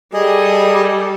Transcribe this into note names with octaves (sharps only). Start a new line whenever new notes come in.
G3 G#4 A4 D#5